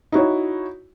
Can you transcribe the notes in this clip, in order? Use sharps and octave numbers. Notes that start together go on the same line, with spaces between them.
D#4 E4 F#4 C#5